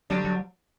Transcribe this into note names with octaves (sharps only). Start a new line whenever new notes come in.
D3 F#3 G3 D4
F#3